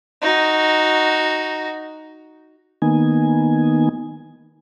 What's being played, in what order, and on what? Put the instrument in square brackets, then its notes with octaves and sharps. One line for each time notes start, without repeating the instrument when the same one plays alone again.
[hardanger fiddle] D#4 F#4
[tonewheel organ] D#3 A#3 B3 D#4 G#5